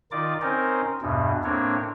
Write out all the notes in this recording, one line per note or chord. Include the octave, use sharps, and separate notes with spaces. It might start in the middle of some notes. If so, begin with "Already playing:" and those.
D#3 D#4 F4 D5 D6
C4 C#4 D#4 A#4 C5
E2 G2 B2
A2 A#3 C4 D4 C#5